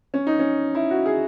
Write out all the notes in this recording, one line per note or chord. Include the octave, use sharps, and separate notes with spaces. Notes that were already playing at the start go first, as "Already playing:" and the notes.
C#4
D#4
C#4
E4
F#4
G#4